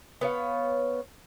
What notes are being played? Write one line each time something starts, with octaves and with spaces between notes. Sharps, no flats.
B3 C#5 F5